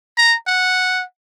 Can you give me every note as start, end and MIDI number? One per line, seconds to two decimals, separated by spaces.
0.18 0.36 82
0.47 1.03 78